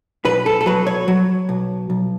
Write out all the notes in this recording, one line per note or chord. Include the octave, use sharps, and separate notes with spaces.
B1 B4
A4
A4
F#3 B4
C#5
F#3
B1
B1